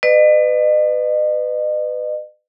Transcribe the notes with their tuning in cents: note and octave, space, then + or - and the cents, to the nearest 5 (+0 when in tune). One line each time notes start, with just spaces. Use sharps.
B4 +25 D#5 -40